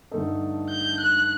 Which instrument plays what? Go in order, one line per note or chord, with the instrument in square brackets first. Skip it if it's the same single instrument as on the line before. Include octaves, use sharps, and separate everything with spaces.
[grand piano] G2 D3 A3 D#4 A4
[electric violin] G6
F#6